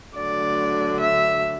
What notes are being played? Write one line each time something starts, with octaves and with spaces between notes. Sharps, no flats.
D2 D3 F#3 D5
E5